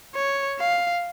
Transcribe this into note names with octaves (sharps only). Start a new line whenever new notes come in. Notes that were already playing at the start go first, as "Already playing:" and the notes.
C#5
F5